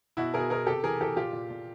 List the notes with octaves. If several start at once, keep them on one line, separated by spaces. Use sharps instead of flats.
B2 E4 F#4
B2 G#4 A#4
B2 G#4 A#4
C3 G4 A4
E3 G#4 A#4
E3 G4 A4
A#2 F4 G4
A#2
A#2